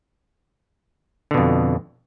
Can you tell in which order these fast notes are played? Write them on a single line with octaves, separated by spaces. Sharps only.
D3 B2 F2